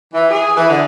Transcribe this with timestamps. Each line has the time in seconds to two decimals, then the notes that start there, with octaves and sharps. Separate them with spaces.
0.14 E3
0.31 G#4
0.57 E3
0.69 D3